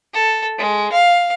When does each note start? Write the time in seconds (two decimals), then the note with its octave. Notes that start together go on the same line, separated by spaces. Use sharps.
0.14 A4
0.58 G#3
0.92 F5